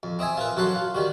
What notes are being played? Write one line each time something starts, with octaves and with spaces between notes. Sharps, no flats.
F2
C4 D#5 E5 G#5
F4 A#4 B4
F#2 F#3 A4 F#5 B5 C6
F4
D#3 G3 F#4